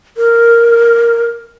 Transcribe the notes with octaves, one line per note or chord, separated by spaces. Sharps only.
A#4